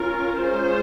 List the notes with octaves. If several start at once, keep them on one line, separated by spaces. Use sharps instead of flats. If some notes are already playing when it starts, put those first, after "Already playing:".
Already playing: C#4 F4 A#4
G#3 C#4 F4 C5